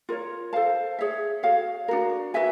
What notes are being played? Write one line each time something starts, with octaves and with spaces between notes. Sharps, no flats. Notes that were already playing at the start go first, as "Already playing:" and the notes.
F4 A#4 C#5
A4 C5 F5 A5
G#4 C#5 E5
F#4 A4 C#5 F5
D4 F#4 A#4
F#4 B4 E5 G#5